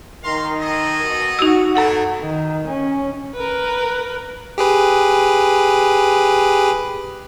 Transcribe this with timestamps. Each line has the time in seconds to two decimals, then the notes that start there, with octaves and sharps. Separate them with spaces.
0.23 D#3 F5 A#5 C6
0.62 G#4 A4 D#5
1.02 B2
1.39 D#4 F#4 E6
1.75 F#2 B2 A3 D4 E4 A4 F#5
2.22 D#3
2.68 C#4
3.35 A#4 B4
4.58 G4 G#4 B4